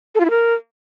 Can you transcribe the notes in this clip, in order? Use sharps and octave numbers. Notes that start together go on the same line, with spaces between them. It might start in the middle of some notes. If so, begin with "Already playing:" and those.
A4
F4
E4
A#4